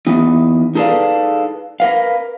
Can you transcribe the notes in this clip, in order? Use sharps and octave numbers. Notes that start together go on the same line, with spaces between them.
E3 B3 D#4
D#4 G#4 A4 B4 D5 F5
A#4 B4 F5